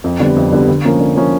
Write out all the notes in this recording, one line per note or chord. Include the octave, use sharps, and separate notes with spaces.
F2
D3 G3 B3
F2
D3 G3 B3
D3
F3 A#3 C#4
D3
F3 A#3 C#4